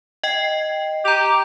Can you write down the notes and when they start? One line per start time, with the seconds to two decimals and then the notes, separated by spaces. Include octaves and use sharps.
0.23 D#5 G5 C7
1.05 G4 A#5 F7